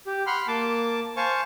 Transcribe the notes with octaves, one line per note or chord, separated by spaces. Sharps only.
G4
F#5 B5 C6 F6
A#3 A5 D6
C5 F5 G#5 A5 C#6